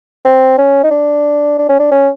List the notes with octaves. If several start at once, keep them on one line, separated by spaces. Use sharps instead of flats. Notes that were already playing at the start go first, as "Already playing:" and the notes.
C4
C#4
D#4
D4
D4
C#4
D4
C#4